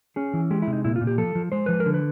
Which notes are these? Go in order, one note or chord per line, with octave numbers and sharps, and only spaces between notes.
C#4 G#4
E3
G#3 G4
E4
C3
D#4
A#2 E4
F4
A#2
G4
F3 A4
F3
G#3 C5
F3 B4
A#4
D3
B4